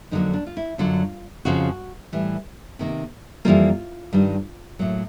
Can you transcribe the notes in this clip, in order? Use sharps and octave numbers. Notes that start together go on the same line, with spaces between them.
F2 D3 F#3 A#3 D#4
D4
F4
E4
F#2 D3 F#3 F4
F2 C#3 F3 F#4
A2 E3 G3
C3 D#3 G3 A#3
F2 C#3 E3 G3 A#3 F4
G2 D#3 G3
A2 F#3 A#3